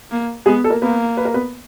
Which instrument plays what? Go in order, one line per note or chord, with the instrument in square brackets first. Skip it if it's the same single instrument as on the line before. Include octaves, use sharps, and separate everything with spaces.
[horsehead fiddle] A#3
[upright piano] G#3 G#4 [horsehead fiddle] B3
[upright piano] A4
A#3 A#4
[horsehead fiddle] A#3 [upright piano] B3 B4
[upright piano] B4
A#4
B3 B4